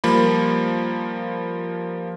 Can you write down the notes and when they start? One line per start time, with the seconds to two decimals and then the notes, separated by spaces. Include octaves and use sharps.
0.04 F3 G3 A#3 B5